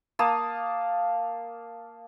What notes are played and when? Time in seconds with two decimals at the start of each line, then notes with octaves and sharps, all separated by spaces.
0.19 A#3 F5 A5 D#6